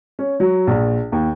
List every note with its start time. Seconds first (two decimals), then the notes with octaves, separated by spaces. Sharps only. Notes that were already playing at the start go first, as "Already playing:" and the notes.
0.19 C#4
0.40 F#3
0.67 A#1
1.12 D#2